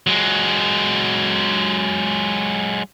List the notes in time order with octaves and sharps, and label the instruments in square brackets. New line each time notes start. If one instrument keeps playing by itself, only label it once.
[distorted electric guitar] F#3 G#3